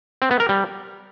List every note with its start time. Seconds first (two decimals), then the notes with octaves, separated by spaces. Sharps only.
0.22 C4
0.31 B3
0.40 A#4
0.49 G3